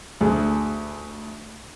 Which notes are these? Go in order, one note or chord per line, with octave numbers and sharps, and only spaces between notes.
D2 G#4